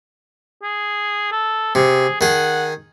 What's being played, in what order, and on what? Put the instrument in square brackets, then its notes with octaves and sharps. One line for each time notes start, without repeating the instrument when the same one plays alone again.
[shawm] G#4
A4
[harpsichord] C3 [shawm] G#4
[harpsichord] D#3 G#4 [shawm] F#5